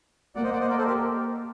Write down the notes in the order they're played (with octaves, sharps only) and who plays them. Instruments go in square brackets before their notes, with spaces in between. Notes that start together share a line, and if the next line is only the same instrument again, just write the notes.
[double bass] A#3 [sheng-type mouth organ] D5 F#5
[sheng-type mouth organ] C5 D#5
D5 F#5
C5 D#5
A#4 D5
A4 C5
G4 A#4